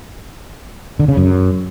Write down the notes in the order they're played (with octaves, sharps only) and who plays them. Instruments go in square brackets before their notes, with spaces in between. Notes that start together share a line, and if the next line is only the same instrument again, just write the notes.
[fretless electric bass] D3
C#3
F#2